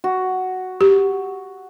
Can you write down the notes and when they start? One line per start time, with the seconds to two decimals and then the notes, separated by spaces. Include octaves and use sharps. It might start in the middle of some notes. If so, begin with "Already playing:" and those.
0.04 F#4
0.81 G4